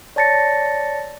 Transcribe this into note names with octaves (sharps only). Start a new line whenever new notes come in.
C#5 D5 A5 A6 A#6 C#7